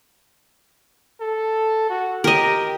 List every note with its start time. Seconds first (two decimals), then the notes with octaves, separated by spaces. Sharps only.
1.20 A4
1.90 F#4
2.24 G4 A#4 D#5